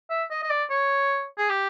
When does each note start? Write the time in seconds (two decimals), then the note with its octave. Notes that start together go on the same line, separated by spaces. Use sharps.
0.10 E5
0.31 D#5
0.43 D#5
0.50 D5
0.70 C#5
1.38 G#4
1.49 G4